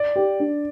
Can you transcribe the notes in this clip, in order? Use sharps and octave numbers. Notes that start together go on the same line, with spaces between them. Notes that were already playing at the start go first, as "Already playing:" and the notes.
Already playing: D5
G4
D4